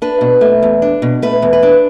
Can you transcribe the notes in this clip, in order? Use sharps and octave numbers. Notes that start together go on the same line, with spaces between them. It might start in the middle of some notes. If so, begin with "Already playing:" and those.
D4 B4
B2
A3
E2
D4
B2
A3 B4
E2
B4
D4